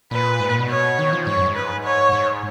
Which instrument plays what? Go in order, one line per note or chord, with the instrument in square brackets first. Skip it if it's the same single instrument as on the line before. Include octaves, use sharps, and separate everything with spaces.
[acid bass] A#2 [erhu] B4
[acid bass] G#2
A#2
B2
[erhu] C#5
[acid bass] D#3
F3
[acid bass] G#2 [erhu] C#5
[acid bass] F#2
G#2
[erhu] B4
C#5
[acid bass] G#2